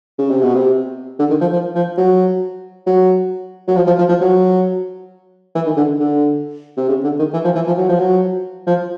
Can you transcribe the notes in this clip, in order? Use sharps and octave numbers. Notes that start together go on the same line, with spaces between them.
C#3
C3
B2
C3
D3
D#3
F3
F3
F3
F#3
F#3
F#3
F3
F3
F3
F3
F#3
E3
D#3
D3
D3
C3
C#3
D3
D#3
E3
F3
E3
F3
F#3
F3
F#3
F3